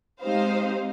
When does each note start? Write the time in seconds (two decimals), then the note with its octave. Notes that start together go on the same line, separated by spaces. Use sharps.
0.21 G#3 C4 D#4 G4 C5 F5